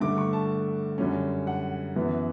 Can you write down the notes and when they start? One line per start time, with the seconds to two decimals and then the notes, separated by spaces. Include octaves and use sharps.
0.01 G2 D3 A3 D6
0.18 C#6
0.33 A5
0.98 F#2 D3 G3 C#4
1.47 F#5
1.96 F#2 E3 B3